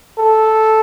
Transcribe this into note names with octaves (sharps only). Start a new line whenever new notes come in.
A4